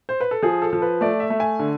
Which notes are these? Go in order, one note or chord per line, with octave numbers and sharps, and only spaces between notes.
C5
B4
A4
F3 G#4
A4
F3
B4
A3 D5
E5
A3
G#5
D3